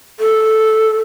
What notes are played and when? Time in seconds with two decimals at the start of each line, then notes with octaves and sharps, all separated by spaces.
0.20 A4